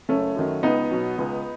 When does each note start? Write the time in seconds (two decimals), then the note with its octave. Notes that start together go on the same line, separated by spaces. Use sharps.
0.09 F#1 A3 C#4
0.36 F#2 D#3 F#3
0.63 C#2 B3 D#4
0.91 B2 F#3
1.18 C#2